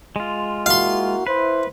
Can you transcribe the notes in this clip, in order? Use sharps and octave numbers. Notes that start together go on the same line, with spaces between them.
G#3 F4
A#3 E4 F#4 F5 C6
E4 B4 C5